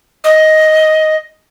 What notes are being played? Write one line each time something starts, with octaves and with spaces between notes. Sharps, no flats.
D#5